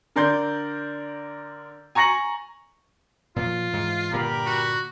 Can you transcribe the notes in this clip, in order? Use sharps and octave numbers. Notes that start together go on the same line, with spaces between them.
D3 A#4 D5 C6 G6
G#5 A#5 C#6 A#6 C#7 F#7
A#2 F3 F#3 F4
G#2 E3
G2 A#2 D3 G4 A#4 B5
F#4